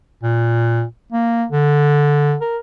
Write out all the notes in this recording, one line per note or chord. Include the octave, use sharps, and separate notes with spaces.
A#2
A#3
D3
A#4